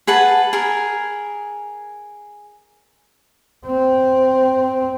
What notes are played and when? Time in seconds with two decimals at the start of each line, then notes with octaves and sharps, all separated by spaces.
0.07 G#4 B4 F#5 A5
0.53 G#4 A#4
3.66 C4